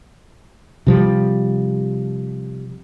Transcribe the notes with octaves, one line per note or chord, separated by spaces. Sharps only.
C3 F3 G3